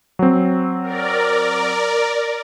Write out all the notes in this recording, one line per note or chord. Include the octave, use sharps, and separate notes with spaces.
F#3 C4
A#4 D5